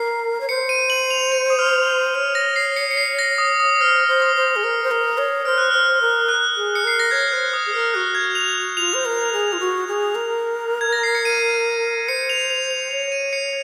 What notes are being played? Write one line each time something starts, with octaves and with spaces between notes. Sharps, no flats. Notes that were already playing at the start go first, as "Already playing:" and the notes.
Already playing: A#4 C7
C#5
C5 C#7
D#7
F#7
F7
D#7
D#6
F6
C#5 F6
A#6
C7
C#7
C#7
C7
A#6
D#6
D#6
C5 F6
C5
D#6
C5
G#4
A#4 F6
C5
A#4
C#5
C5 F6
F#6
C5 F6
A#4
F#6
G#4
C#7
A#4 C7
A#6
C#5 G#6
C5 F#6
D#6
G#4
A#4 F6
F#4 F#6
G#6
F7
F4 F7
C5
A#4
G#4
F4
F#4
G#4
A#4
G#6
A#6
C7
C#7
D#7
C5 C#7
F7
F7
F7
C#5 F7
D#7
C#7